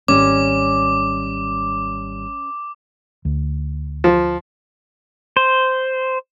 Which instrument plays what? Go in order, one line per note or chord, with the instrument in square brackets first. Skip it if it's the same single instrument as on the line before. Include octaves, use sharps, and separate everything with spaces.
[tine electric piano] G#1 G3 [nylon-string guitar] C#4 [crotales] D6
[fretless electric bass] D2
[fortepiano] F3
[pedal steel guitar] C5